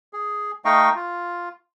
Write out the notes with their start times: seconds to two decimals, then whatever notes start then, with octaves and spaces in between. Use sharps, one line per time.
0.13 G#4
0.65 A3 D#4 D#5 F5 G5 C#6
0.95 F4